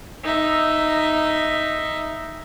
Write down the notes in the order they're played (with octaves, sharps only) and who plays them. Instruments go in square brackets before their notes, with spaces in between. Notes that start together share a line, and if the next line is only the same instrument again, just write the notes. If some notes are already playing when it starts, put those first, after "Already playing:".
[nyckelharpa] D#4 E5